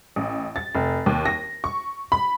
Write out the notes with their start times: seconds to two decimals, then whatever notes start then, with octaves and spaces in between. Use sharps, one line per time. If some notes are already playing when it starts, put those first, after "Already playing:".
0.16 A1
0.56 A6
0.75 F1
1.06 D#2
1.25 A#6
1.64 C#6
2.12 B5